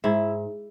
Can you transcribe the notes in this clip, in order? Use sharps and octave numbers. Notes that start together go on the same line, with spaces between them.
G#2 E4